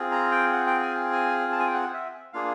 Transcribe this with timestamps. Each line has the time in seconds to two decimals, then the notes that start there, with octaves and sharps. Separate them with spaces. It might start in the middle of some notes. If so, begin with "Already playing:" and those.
Already playing: C4 F4 G#4
0.12 A#5
0.31 G5
0.53 F#5
0.67 G5
0.83 G#5
1.12 G#5
1.52 A5
1.59 G#5
1.66 G5
1.74 F#5
1.94 E5
2.33 A#3 D4 F4 G#4 F5